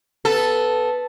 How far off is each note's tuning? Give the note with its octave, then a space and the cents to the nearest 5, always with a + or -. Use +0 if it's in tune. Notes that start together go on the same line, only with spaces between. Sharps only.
B3 +5 A4 -5